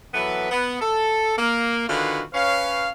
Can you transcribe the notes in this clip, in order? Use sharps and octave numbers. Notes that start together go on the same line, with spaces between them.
E3 F#3 B3 A4 B4
B3
A4
A#3
D3 D#3 F4 F#4 G#4 B4
C#4 B4 C#5 F5